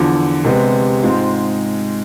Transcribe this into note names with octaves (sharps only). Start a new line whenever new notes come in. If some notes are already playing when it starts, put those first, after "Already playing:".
Already playing: E2 D3 F3
C2 C3 G#3 B3
G#2 G#3 C4 F4